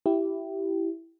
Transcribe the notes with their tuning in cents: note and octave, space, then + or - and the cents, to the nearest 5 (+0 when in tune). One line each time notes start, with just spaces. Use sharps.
E4 +5 G4 -15